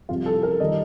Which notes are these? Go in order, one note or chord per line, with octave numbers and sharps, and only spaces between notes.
F2 C3 G3 F4
A4
A#4
D#3 G3 D#5